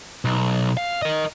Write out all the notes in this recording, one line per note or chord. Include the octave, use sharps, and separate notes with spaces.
B1
F5
A#4 D#5